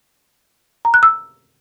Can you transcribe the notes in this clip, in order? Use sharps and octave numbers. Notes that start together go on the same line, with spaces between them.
A#5
F#6
E6